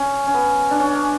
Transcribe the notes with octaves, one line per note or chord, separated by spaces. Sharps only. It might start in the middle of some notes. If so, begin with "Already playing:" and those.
Already playing: C#4
C#4
B3
D4
C#4
D4